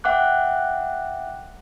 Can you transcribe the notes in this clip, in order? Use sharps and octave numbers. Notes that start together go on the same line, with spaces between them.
E5 F#5 G5 D6 F#6